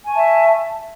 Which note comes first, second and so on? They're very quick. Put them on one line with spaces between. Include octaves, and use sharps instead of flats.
G#5 C#6 A5 E5